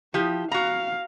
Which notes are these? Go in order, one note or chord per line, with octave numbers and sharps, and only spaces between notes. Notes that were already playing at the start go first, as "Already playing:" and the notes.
F3 E4 G4
F#4 F5 A#5